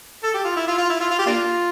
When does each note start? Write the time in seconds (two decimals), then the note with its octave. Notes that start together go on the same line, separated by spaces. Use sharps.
0.23 A4
0.34 G4
0.45 F4
0.57 E4
0.68 F4
0.78 F4
0.90 E4
1.00 F4
1.11 F4
1.19 G4
1.27 A#3 D4 F4